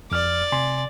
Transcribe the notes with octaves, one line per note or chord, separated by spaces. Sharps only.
F2 D5 F6
C3 G#5 C6